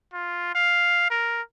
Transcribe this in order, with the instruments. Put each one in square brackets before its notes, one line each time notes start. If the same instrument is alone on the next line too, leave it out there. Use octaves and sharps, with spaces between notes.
[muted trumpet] F4
F5
A#4